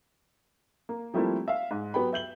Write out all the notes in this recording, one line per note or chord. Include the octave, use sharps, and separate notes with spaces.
A#3
F3 G3 A3 A#3 C4 E4
E5 F5
G#2
F#3 B3 G4 G5 B5
E5 G6 F#7 G7